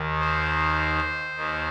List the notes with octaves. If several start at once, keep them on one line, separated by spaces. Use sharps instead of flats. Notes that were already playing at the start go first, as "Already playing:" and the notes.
Already playing: D#2 D#3
C5
D#2 D#3